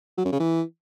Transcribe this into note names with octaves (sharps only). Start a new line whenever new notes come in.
F#3
F#2
C#3
E3